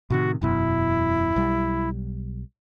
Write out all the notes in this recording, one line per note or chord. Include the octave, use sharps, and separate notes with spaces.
A2 C3 D#3 F#4
E1 F#2 B2 E4
B1 G3